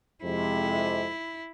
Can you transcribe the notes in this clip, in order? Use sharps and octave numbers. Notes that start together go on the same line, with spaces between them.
F2 C3 G#3 E4